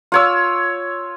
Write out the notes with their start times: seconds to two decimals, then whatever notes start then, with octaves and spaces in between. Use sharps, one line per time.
0.12 F4 C#5 E6